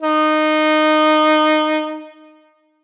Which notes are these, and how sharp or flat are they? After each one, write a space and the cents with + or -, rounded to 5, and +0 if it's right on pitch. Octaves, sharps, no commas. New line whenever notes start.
D#4 -15